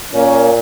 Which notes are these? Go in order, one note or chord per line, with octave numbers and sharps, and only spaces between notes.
A#2 A#3 C#4